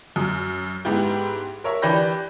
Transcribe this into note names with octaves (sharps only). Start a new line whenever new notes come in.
F#2 D#6
G#2 B3 E4 G4
A#4 C#5 E5
E3 D4 G4 B5 G6 A#6